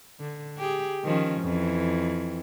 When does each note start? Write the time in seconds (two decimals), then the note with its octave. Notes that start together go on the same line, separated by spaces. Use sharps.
0.20 D3
0.58 G4 G#4
1.04 D#3 F3 C#4
1.42 F2 E3